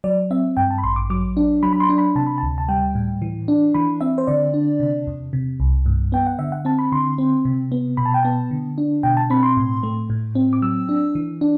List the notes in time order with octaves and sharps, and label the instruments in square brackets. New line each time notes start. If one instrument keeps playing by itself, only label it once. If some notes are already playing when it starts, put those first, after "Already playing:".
[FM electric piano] F#3 D5
C4 E5
G2 G5
A5
B5
A1 C6
D6
F#3 D6
D4
F#3 B5
B5
C6
D4
B5
C3 A5
B5
A5
D2
A5
G3 G5
A2
E3
D4
E3 B5
C4 E5
C5
D3 D5
D4
C3
E2
C3
C2
G2
B3 G5
F#5
D3 E5
F#5
C4 A5
B5
D3 C6
C4
C3
B3
B2 B5
A5
G5
B3 A5
D3
D4
B2 G5
A5
C4 B5
C6
A2
A3
A2
C4
D6
F#3 E6
D4
E3
D4